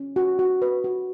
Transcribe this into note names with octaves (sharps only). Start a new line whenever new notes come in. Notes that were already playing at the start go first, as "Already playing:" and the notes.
Already playing: C#4
F#4
F#4
B4
F#4